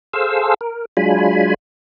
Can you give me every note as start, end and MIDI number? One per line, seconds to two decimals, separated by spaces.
0.13 0.54 68
0.13 0.54 69
0.13 0.54 72
0.13 0.54 77
0.13 0.54 88
0.61 0.85 70
0.97 1.54 54
0.97 1.54 56
0.97 1.54 62
0.97 1.54 65
0.97 1.54 80
0.97 1.54 83